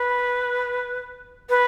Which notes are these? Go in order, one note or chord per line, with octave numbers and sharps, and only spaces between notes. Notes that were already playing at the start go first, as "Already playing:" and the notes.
Already playing: B4
B4